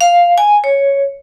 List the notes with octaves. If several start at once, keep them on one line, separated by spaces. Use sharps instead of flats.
F5
G#5
C#5